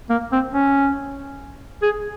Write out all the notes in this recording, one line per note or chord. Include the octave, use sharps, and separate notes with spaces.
A#3
C4
C#4
G#4